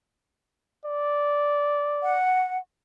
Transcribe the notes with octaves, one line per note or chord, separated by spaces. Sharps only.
D5
F#5